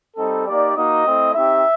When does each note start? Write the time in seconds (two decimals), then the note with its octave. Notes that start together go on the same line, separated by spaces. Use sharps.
0.17 G3 C4 D#4 A4
0.46 A#3 D#4 G4 D5
0.76 A#3 D#4 F#4 D#5
1.05 A3 C4 E4
1.35 C4 D#4 G4 E5